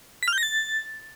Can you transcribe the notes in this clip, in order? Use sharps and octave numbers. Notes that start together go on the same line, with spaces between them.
B6
F6
G6
A#6
A6